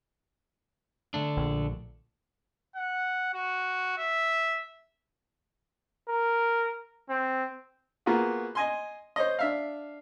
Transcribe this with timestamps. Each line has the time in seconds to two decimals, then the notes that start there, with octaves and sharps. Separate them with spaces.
1.14 D3 A3 D4
1.37 A#1
2.76 F#5
3.34 F#4
3.98 E5
6.08 A#4
7.10 C4
8.06 A#3 B3 F4 F#4 G#4
8.55 D#5 G#5 C6
9.16 C5 C#5 D#5
9.39 D4 E5 F5